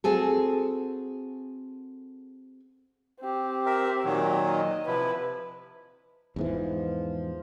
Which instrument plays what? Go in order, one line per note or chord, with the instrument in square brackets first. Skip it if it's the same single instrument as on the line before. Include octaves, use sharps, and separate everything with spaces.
[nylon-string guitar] C4 F#4 G#4 A4
[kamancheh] C4 G4
[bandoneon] A#4 E5
A#2 D#3 F#3
[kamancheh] D#5
[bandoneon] C3 F3 E4 [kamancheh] B4
[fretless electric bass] E2 G#2 E3 [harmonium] F3